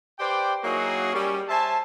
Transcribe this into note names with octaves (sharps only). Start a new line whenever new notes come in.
G4 B4 C5 D5 G5
F#3 A#3 D#4 E4 F#4 G#4
G3 C#4
C5 E5 G#5 A5